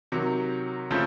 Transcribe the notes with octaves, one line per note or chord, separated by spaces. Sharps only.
C3 D#3 F#3
C#3 F3 A3 C4